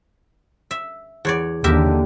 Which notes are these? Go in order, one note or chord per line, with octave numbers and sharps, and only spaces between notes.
E5
E2 C#5 D5
D#2 D3 G4 A#4 E5